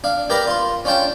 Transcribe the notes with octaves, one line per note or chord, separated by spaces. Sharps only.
D4 F5
G4 A#4 B4 D5 A#5
F4 C6
C#4 D4 F4 G5 A5